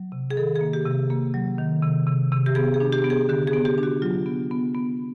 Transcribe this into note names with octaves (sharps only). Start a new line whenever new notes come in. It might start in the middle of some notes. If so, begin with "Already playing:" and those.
Already playing: F#3
C3
G#4
D#3 A4
G#4
A#3
G4
C3
A#3
F#3
D#3
C3
C3
C3
G4
B3 G#4
G#4
D4
G4
B3
G#4
D3 G4
G#4
B3
G4
D4
F#4
F#3 F4
B3
B3
B3